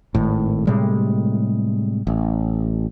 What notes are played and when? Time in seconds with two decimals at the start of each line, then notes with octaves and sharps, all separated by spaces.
0.15 G#1 A2
0.67 A2 C3 G3 G#3
2.07 A1